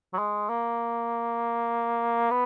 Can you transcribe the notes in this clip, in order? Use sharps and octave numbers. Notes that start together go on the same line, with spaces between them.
F#3
G#3
A#3
B3